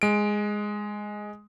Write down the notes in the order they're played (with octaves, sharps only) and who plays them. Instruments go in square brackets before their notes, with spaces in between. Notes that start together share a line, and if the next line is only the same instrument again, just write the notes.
[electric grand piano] G#3 D7